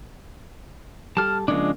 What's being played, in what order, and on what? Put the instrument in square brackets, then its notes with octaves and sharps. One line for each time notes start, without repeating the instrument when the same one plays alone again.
[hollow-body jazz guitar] G3 A4 [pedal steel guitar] A5 F6
[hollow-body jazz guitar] C#3 A#3 [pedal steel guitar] F3 G#3 D4